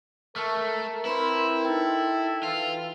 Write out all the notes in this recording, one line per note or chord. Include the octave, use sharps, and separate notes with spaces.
A3 A4 A#4 A5 C#6 F6
C4 E4 B4 B5 C6
D#4 A4 G5
E3 F4